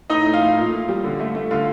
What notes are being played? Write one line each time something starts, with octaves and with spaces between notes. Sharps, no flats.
A2 D#4 D#5
A3
F4 F5
A3
A#2
A#2
G3
D3
A3
A3
D3 F4 F5